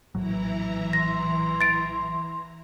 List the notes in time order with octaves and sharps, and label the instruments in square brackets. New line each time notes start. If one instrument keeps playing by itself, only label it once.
[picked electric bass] A#1 A2 F#3 [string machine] E3 E4 A#5
[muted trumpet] C6 [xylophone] A#6
[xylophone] A6 D7